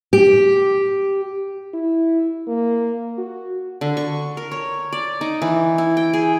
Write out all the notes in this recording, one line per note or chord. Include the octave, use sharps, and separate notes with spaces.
G4
E4
A#3
F#4
D3
C#6
A#4
C#5
D5
D#4
E3
E4
G5
G#4